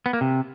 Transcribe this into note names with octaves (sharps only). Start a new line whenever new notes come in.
B3
A#3
C3